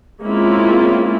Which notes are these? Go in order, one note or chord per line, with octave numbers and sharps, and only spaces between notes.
G#3 A#3 C4 C#4 E4 F4